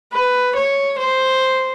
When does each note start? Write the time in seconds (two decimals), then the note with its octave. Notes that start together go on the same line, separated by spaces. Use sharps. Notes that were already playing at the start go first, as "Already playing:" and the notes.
0.12 B4
0.55 C#5
0.99 C5